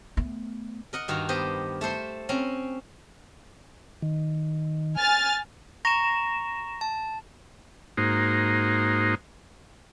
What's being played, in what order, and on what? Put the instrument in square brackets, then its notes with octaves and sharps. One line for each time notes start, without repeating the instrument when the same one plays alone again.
[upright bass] A3 B3
[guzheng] A#4 D#5 F#5
G2 D#3 F#4 F5
B3 G4 C5 D#5
A3 A4 C5 C6
C4 C#4 A#5
[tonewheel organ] D#3
[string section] G#5 F6 A6
[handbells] A#5 C#6 [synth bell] A#6 E7
[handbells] A5
[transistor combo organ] G#2 A#3 D#4 F#4 C5